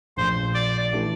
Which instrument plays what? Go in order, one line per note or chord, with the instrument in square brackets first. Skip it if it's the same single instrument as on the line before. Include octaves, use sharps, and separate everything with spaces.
[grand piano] A#1 A#2 A3 [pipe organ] C5
[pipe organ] D5
[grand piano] E3 A3 D4 G4